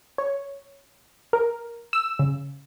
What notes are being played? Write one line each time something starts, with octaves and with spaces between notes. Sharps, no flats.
C#5
A#4
E6
C#3